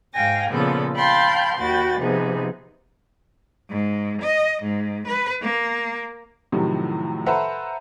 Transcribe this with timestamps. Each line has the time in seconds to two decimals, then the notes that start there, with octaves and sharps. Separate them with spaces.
0.13 G#2 F5 G5 G#5 A#6
0.50 A#2 C#3 F3 B3 A4
0.94 F5 G5 A5 B5 C6 G6
1.56 D#2 F#4 G5 B5 A6
1.97 C3 F3 B3 D#4 G#4
3.69 G#2
4.22 D#5
4.62 G#2
5.07 B4
5.42 A#3
6.52 A2 C3 D#3 F3 F#3
7.26 A4 B4 C5 E5 F#5 A#5